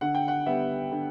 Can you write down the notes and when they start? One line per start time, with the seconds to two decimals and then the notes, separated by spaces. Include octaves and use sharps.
0.01 D3 F#5
0.14 G5
0.28 F#5
0.46 G3 B3 E5
0.92 D3